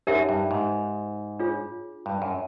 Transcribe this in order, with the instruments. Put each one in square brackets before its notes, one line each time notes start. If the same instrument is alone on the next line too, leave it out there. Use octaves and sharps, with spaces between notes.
[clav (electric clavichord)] F#2 [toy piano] D#4 G4 A#4 C#5 E5
[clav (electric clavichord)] G2
G#2
[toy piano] D4 F4 G#4 C#5
[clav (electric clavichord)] G2
F#2